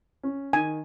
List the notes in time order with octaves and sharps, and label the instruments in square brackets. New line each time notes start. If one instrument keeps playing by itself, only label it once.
[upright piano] C#4
[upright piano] D#3 [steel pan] G#5